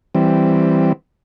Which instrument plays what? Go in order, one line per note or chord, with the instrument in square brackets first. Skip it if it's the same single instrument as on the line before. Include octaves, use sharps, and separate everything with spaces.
[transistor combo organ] E3 G3 C4